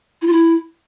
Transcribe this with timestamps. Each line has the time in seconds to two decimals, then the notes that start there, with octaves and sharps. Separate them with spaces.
0.22 E4
0.27 F4
0.33 E4